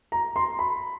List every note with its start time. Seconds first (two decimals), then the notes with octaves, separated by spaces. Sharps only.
0.12 A#5
0.36 C6
0.59 B5